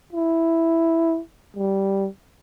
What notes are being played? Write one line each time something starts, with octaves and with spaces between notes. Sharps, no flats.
E4
G3